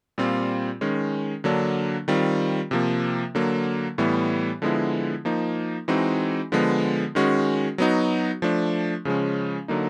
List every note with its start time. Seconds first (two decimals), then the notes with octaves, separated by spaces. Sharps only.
0.18 A#2 G3 C4 F4
0.81 D#3 G#3 C#4
1.44 D3 F#3 A#3 D4
2.08 D#3 G3 C4 F4
2.71 C3 F3 A#3
3.35 D3 F#3 A#3
3.98 A2 E3 G3 B3
4.62 D3 F3 G#3 B3 E4
5.25 F3 A#3 D#4
5.88 E3 G#3 C4 D#4 F#4
6.52 D3 F3 G#3 B3
7.15 D#3 G#3 C#4 F#4
7.78 F#3 B3 D#4 F#4
8.42 F3 A3 D4
9.05 C#3 F3 G#3 C#4
9.68 D3 F#3 A#3 D#4